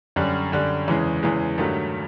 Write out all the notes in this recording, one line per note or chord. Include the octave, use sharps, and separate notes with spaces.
F#2 D3 G3
F#2 D3 G3
E2 C#3 E3 G#3
E2 C#3 E3 G#3
G2 D#3 F#3 A3